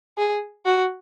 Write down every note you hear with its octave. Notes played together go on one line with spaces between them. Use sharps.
G#4
F#4